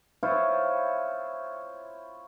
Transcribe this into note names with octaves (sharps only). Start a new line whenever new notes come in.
E4 F4 C5 C#5